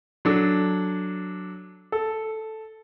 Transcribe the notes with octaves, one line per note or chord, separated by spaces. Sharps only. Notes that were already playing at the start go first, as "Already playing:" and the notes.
F#3 D4 A4
A4